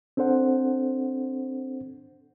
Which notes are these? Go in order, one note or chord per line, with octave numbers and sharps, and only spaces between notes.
C4 D4 A4 C5 F#5